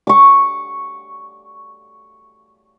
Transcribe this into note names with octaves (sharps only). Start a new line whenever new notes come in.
C#6 D6